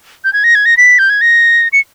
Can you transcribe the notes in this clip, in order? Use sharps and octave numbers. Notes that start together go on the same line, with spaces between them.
G6
G#6
A#6
G#6
A#6
B6
G6
G#6
A#6
C#7